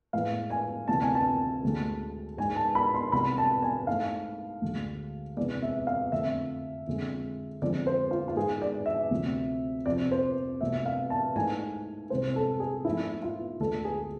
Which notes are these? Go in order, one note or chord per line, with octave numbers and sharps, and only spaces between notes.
A2 E3 G#3 F5
G#5
D2 C3 E3 A5
G#5
A5
D2 D3 G#3
G#2 G#3 G#5
A5
B5
C6
C2 B2 G#3 B5
A5
G#5
G#2 E3 A3 F5
D2 D3 G#3
E2 C3 E3 G#3 D5
E5
F5
F2 D3 A3 E5
F2 D3 G#3
F2 D3 F3 G#3 D5
C5
F4
F4
G#2 G#3 G#4
D5
E5
D2 C3 F3
F2 C3 F3 D5
C5
C2 B2 A3 E5
F5
A5
G#2 E3 A3 G#5
C2 C3 E3 G#3 C5
A4
G#4
G#2 F3 A3 E4
F4
D2 D3 G#3 A4
G#4